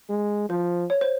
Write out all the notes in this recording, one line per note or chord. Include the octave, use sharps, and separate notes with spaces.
G#3
F3 C5
C#5
C5